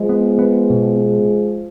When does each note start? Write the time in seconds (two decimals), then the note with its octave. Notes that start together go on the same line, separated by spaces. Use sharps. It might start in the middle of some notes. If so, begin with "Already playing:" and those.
Already playing: F3 G#3
0.09 B3
0.39 B3
0.70 B2